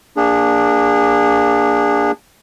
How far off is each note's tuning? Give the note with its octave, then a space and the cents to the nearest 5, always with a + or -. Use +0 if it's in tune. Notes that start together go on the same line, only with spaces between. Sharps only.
A#3 +5 D4 +0 G#4 -25